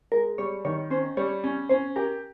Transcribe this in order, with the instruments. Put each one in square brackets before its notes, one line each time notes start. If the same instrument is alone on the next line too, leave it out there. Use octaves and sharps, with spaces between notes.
[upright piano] G#3 [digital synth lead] A#4
[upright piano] G3 [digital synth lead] C#5
[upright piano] D#3 [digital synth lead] C#5
[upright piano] C#4 [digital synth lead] C5
[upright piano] G3 [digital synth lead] C#5
[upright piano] C#4
[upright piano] C#4 [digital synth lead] C5
[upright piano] G4 [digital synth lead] A#4